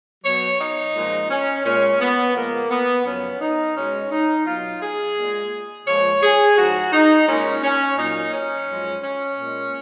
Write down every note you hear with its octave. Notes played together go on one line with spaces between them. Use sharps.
B2 F#3 C#5
D#4
A#2 F3 G#3
C#4
A#2 G#3 C#4
B3
A#2 F3 G#3 A#3
B3
F#2 C#3 F3 C#4
D#4
B2 G#3 C#4
D#4
B2 F#3 F4
G#4
A#2 G#3
A#2 F3 G#3 C#5
G#4
G#2 F3 G#3 F#4
D#4
A#2 G#3 C#4
C#4
A#2 F#3 D#4
C#4
F#2 F3 G#3
C#4
A#2 G#3